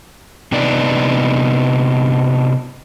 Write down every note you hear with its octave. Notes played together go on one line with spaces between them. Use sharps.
C3 B3 D4 D#4 D5